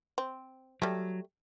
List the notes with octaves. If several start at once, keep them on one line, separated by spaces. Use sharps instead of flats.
C4
F#3 G3 A3